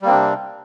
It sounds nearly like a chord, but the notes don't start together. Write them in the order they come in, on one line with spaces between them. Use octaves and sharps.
G3 A#3 C4 D4 C3